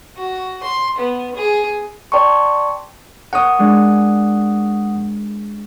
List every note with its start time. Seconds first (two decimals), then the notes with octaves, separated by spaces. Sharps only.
0.17 F#4
0.63 C6
0.98 B3
1.35 G#4
2.12 D5 G5 A5 C6 C#6
3.33 A#4 C#5 F#5 D#6 F#6
3.59 G#3 D4